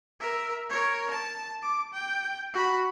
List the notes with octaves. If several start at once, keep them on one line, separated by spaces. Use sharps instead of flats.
A#4 E5
A#4 C#5
A5
D6
G5
F#4 B5